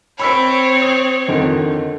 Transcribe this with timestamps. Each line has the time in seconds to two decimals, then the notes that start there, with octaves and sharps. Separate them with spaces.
0.20 C4 C#5 B5 E6 B6
0.82 D#6
1.28 F2 D3 D#3